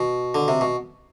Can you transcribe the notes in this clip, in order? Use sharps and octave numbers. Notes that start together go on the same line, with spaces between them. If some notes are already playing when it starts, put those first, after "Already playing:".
Already playing: B2
D3
C3
B2